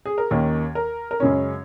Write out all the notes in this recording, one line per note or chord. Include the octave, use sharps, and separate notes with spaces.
G#4
A#4
D#2 D#3 A#3 C#4 C#5
A#4
A#4
F#2 C#3 G#3 C#4 C#5